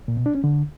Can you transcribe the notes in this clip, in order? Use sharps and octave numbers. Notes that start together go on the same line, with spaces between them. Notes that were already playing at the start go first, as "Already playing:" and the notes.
A#2
B2
D4
C#4
D3